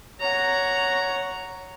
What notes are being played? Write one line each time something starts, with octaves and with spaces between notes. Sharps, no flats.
C#5 F#5 A#5